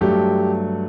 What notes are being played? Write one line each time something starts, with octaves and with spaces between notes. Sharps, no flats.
G2 F#3 A3 G4